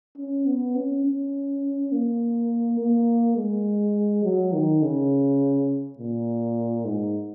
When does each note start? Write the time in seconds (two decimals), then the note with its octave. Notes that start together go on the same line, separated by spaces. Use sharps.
0.18 C#4
0.47 B3
0.76 C#4
1.05 C#4
1.92 A#3
2.80 A#3
3.37 G#3
4.24 F#3
4.53 D#3
4.82 C#3
5.99 A#2
6.85 G#2